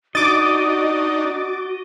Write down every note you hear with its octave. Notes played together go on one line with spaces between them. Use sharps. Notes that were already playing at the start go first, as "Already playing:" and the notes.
D4 D#4 F#4 D#5 D6 A6